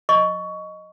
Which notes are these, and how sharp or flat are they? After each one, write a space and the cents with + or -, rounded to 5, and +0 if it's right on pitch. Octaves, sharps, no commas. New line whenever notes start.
D#5 +0 C#6 +15